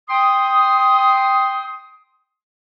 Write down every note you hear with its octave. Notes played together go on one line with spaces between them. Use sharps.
G5 C6 D#6